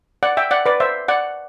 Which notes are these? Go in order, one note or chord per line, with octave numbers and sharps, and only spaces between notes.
D5 F#5
E5 G5
D5 F#5
B4 D5
C5 E5
D5 F#5